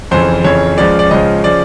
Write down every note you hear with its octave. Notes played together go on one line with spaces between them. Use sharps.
F2 C#3 E3 C5
F2 C#3 E3 C#5
C#2 C#3 F3 D5
D5
C#2 C#3 F3 D#5
C#3 F3 D5